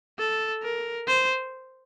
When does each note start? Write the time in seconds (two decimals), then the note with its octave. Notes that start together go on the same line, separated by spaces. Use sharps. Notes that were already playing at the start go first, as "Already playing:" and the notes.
0.19 A4
0.63 A#4
1.08 C5